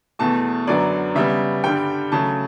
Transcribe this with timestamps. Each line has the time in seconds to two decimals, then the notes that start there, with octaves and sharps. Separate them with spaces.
0.19 E2 B2 A3 A5
0.67 F#2 D3 F#3 B3 D5
1.15 C#3 G3 B3 E5
1.64 G2 D3 G3 G5
2.12 C#3 F#3 A3 A5